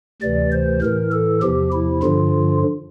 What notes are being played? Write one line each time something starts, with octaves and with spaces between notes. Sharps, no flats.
D2 C3 E3 D5
C5
A2 E3 A#4
A4
E2 C3 F3 G4
E4
G2 D3 F3 F4